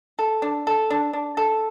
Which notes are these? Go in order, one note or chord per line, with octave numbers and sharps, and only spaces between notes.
A4
D4
A4
D4
D4
A4